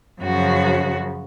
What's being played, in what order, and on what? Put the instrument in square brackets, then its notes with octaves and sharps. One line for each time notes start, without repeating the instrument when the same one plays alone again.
[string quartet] F#2 C#3 F3 F#4